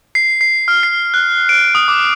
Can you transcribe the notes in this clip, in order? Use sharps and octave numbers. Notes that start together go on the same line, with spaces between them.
C7
C7
F6
C7
F#6
D7
D#6
D6